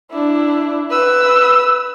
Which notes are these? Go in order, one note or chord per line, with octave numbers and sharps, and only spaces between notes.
D4 E4
B4 E6